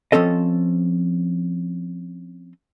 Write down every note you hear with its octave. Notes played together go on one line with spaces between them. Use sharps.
F3 C4 C#4 A4 D#5